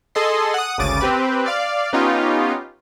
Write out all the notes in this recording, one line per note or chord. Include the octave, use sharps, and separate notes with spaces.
G#4 A4 D#5 C6
F#5 D#6
G#1 D2 C#3 D6 A6 D#7
C4 G4 B4
D5 F5
B3 C#4 D#4 F4 G4